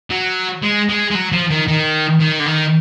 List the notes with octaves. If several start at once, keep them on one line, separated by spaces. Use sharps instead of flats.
F#3
G#3
G#3
G#3
F#3
F3
D#3
D#3
D#3
D3
D#3